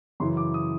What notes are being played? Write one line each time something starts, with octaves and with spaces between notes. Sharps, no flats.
F#2 C#3 E3 C6
D6
D#6